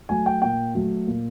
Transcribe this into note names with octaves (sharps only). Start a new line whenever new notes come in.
F#3 A3 G#5
G5
A#2 G5
F#3 A3
A#2